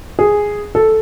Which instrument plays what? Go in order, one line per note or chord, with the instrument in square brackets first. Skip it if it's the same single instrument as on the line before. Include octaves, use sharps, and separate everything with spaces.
[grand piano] G#4
A4